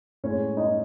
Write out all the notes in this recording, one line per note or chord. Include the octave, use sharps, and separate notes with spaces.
A2 G#3 C#4 C#5
D#4 D#5